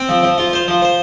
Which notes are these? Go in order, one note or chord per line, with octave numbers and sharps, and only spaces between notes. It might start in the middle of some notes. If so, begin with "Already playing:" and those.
Already playing: C4
F3
F3
F4
C5
F3
C5